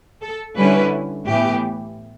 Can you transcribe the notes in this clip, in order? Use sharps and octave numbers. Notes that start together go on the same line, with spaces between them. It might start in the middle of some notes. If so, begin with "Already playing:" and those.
A4
D3 G3 C#4 E4 B4
A2 E3 B3 G4